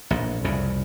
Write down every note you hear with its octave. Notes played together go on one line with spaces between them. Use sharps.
A#1 A2
C2 F2 C#3